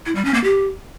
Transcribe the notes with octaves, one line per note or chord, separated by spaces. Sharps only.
E4
G3
C#4
A#3
G4